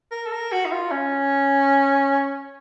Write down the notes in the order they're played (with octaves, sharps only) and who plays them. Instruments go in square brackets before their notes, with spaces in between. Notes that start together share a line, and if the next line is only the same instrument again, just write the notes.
[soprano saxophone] A#4
A4
A#4
F#4
D#4
F4
C#4